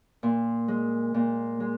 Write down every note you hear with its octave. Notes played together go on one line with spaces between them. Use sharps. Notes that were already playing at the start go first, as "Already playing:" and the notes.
A#2
G#3
A#2
G#3